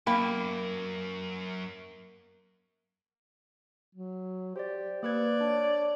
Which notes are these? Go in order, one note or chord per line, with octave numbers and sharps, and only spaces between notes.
F#2 A#3 G5 B5
F#3
G4 C5 D5
A#3 B4 D5 G#6
D4 C#5